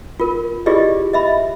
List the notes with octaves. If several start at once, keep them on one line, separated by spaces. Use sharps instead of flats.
F4 A#4
E4 F4 G4 G#4 D5 D#5
D#5 E5 B5